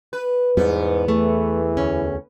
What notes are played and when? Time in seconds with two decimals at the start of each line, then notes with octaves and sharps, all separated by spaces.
0.13 B4
0.57 E2 G#2 G3 B3
1.08 E3 A3
1.77 D2 C#4